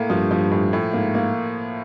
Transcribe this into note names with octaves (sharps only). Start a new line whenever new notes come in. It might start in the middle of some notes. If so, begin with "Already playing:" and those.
Already playing: A2 A#3
G2 F3
F3
A2
A2
G#2 A#3
A#3